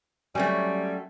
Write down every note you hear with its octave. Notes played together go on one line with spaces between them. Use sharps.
F#3 G3 A3 C4 C#4 G#5